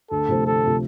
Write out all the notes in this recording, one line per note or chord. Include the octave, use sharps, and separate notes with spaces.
D2 A4
C3 F3 A3 C4
D2 A4
C3 F3 A3 C4